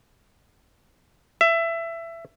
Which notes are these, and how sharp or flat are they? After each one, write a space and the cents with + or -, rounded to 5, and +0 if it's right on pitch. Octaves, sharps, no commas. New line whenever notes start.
E5 +20